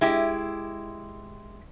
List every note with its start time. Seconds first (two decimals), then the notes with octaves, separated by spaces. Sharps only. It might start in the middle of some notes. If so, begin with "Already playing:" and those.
0.01 G#3 E4 G4